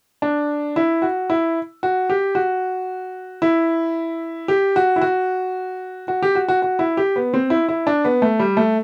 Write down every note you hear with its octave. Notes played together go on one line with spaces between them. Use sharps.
D4
E4
F#4
E4
F#4
G4
F#4
E4
G4
F#4
E4
F#4
F#4
G4
F#4
F#4
F#4
E4
G4
B3
C4
E4
E4
D4
B3
A3
G3
A3